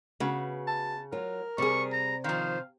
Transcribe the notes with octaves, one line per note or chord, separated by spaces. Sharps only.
C#3 B3 F#4
A5
F#3 F4 A#4
C3 G3 G#4 C#6
A#5
D#3 F3 C5 F5